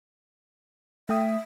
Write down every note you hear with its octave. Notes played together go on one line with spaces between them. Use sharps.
A3 E5 G5 D#6